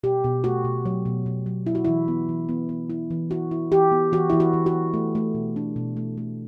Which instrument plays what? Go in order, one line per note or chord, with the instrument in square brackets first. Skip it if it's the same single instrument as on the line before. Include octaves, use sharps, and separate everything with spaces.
[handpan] B2 G4
B2
A3 F#4
B2
F#3
B2
B2
F#3
B3 E4
F#4
E3 E4
B3
E3
B3
B3
E4
E3
E4 F#4
E4
E3 G4
B3
E3 F#4
E3 E4
F#4
E3
F#4
B3
A3
A3
B2
D4
B2
A3
A3